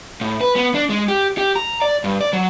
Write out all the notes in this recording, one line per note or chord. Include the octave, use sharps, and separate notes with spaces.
A2
B4
B3
D4
G#3
G4
G4
A#5
D5
G2
D5
F#3